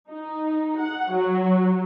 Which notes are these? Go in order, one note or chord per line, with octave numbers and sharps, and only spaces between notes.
D#4
F#5
F#3